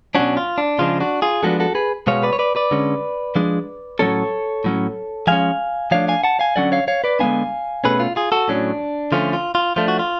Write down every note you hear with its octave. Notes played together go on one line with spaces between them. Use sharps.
B2 F#3 C#4 D4 F#4
F4
D4
C#3 F3 G#3 D4 F4
D4 F#4
F4 G#4
D3 F3 G#3 B3 D4 F#4 A4
F#4 A4
G#4 B4
B2 G#3 B3 C#5 F5
B4 D5
C#5
B4 D5
B4 D5
D3 G#3 C#4
F3 G#3 D4
A2 F#3 A3 C#4 A4 C#5
A2 F#3 C#4
F3 G#3 C#4 F5 G#5
F3 A3 D4 C#5 F5
F5 G#5
F#5 A5
F5 G#5
D3 F#3 C#4 D5 F#5
C#5 F5
C#5 F5
B4 D5
D3 G#3 B3 D4 F5 G#5
B2 A3 C#4 G#4 B4
F4
F4 G#4
F#4 A4
A2 F#3 C#4 D4
D3 F3 A3 C#4 F4
F4
F4
F3 A3 D4 F4
F#4
F4